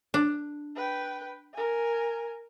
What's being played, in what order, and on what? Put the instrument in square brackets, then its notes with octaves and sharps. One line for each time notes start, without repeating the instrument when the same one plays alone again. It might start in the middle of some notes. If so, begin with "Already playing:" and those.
[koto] D4
[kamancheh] B4 G5
A#4 G#5